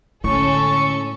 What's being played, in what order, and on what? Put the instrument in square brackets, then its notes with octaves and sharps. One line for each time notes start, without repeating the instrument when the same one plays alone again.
[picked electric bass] A2 [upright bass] D3 G#3 [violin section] C#4 A4 [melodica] C#6